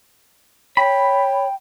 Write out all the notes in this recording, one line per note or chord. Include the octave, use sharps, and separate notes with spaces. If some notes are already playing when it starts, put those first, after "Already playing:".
C#5 G5 B5